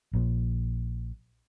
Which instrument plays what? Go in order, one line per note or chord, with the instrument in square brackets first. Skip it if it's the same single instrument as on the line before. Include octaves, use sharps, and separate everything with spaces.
[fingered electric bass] A#1 A#2